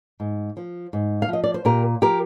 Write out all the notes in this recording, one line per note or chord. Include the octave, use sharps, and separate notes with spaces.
G#2
F3
G#2
F5
F3 D#5
D5
C5
A#2 G4 A#4
F3 G4 A#4